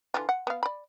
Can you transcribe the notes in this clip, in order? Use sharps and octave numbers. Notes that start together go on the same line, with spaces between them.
D3 E3 F4
F#5
B3 F5
D5 B5